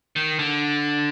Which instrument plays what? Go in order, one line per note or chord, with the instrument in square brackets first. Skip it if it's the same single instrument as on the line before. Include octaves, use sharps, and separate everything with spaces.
[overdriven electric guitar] D#3
D3